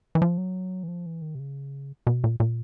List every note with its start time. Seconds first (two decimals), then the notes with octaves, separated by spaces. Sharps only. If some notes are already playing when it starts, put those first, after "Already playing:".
0.15 E3
0.22 F3
0.38 F#3
0.83 E3
0.88 F3
1.06 E3
1.22 D#3
1.35 C3
1.39 C#3
2.07 B2
2.24 A#2
2.40 A#2